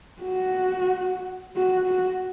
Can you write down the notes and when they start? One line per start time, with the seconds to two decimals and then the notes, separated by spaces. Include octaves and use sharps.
0.22 F#4
1.56 F#4
1.86 F#4